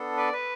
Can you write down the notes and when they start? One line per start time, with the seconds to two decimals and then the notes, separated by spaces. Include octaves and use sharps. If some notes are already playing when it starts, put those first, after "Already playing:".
Already playing: B3 D4 A4
0.17 B4 D5
0.33 B4